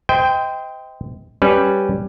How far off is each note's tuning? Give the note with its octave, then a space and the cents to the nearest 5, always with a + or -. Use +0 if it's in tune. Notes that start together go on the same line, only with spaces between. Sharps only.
C5 -25 D#5 +30 G5 +5
G3 +0 C#4 +0 B4 +0